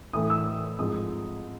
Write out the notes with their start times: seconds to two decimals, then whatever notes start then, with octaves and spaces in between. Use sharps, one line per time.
0.13 A2 E3 A3 D#6
0.30 E6
0.79 G#2 F3 G#3 C4 D#6